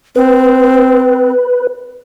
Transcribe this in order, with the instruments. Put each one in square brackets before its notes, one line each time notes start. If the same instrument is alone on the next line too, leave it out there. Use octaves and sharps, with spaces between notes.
[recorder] C4 [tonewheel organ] B4